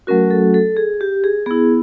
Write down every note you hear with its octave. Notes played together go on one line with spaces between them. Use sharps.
F#3 A3 C#4 F#4 A#4
A4
A4
G#4
G4
G#4
B3 E4 G#4